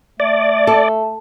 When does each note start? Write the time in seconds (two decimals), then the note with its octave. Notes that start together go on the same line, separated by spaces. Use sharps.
0.20 A3 D5
0.67 A4